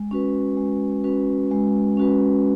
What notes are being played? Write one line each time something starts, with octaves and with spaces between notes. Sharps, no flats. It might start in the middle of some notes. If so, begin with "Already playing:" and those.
Already playing: G#3
C#4 F#4 B4
G#3
C#4 F#4 B4
G#3
C#4 F#4 B4